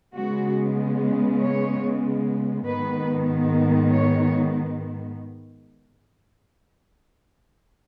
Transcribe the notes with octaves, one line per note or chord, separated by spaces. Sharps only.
C#3 G#3 B3 F#4
C#5
G#2 D#3 B3 B4
C#5